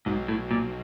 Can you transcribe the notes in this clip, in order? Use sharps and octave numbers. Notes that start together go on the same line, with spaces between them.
B1 G#2 B2
A2
A#2